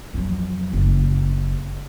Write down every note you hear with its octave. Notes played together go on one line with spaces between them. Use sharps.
F2 F#3
F#1